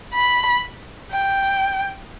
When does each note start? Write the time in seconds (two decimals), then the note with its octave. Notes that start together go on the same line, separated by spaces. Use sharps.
0.14 B5
1.12 G5